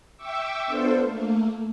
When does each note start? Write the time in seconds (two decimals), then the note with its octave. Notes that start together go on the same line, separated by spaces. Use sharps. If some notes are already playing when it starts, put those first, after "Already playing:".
0.17 E5 G5 C#6 D6 E6
0.67 B3 D4 F4 A4 C5
1.03 A3 A#3